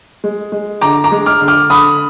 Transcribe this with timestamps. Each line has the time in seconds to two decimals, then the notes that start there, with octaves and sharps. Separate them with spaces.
0.24 G#3
0.52 G#3
0.81 D3 A#5 D6
1.04 A#5 D6
1.12 G#3
1.26 D6 F6
1.41 D3
1.48 D6 F6
1.70 D3 B5 D#6